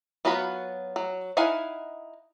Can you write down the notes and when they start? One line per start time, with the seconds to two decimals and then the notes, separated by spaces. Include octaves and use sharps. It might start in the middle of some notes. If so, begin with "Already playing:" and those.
0.25 F#3 B3 F4 F#4 B5
0.96 F#3
1.37 D#4 E4 F5 F#5 G#5